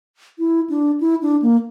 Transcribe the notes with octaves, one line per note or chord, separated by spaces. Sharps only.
E4
D4
E4
D4
A#3